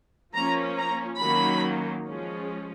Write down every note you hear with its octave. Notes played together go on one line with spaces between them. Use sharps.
F3 A#3 C#4 A#5
A#5
D#3 F#3 A#3 C#4 B5
F3 G#3 C#4